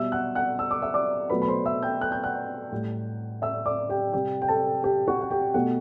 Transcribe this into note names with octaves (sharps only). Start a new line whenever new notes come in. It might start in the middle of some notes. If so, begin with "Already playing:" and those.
Already playing: B2 G3 E5 E6
F#5 F#6
F#5 F#6
E6
D6
E5 E6
D5 D6
B2 F#3 A3 B4 B5
B5
C5 C6
E5 E6
G5 G6
F#6
G6
F#5 F#6
A2 G3
E5 E6
D5 D6
G4 G5
C3 G3 G4 G5
G5
A4 A5
G4 G5
F#4 F#5
F#5
G4 G5
B2 A3 F#4 F#5